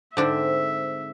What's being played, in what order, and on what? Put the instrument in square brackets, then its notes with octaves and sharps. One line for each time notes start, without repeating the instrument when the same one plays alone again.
[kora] G#2 C4 [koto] D3 D4 [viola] E5